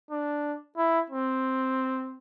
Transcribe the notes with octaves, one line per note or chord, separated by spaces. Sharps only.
D4
E4
C4